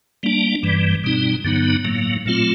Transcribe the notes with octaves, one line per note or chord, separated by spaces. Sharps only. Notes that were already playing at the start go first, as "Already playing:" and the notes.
G3 A#3 D4
G2 E3 G3
B2 G3 C4 D#4
G2 D3 F#3 B3 D#4
A2 F#3 A#3
A#2 F#3 A3 C4 F4